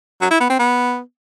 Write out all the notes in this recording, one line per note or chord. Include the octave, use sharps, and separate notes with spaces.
F#3
E4
B3
C4
B3